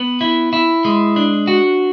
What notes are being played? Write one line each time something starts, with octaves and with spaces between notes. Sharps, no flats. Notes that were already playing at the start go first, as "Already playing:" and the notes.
Already playing: B3
E4
E4
G#3
D4
F#4